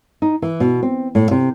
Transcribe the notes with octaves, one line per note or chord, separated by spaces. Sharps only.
D#4
E3
B2
C4
A2
C3